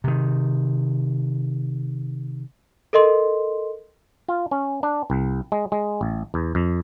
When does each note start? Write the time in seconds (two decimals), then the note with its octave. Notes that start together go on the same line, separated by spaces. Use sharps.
0.04 C3 D#3
2.93 A4 A#4 D#5 C6
4.29 F4
4.51 C#4
4.83 D4
5.10 C2
5.52 G#3
5.72 G#3
6.01 A1
6.34 E2
6.55 F2